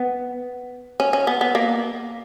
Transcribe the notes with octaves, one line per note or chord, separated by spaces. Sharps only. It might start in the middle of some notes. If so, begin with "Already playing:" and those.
Already playing: B3
C#4
C#4
B3
B3
A#3